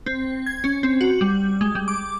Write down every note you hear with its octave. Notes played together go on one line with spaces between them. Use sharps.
C4
G#6
C#4
C4
F#4
G3
G#3
G3
D6